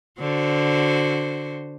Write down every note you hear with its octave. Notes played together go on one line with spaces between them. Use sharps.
D3 F#4 C5